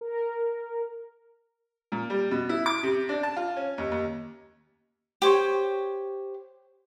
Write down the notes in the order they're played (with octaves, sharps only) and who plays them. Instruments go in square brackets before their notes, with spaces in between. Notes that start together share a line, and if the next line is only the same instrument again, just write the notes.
[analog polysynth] A#4
[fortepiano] A#2
G3
B2
E4
D6
C3
D4
A5
F4
C#4
D#2
D#2
[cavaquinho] G4 C5 C#5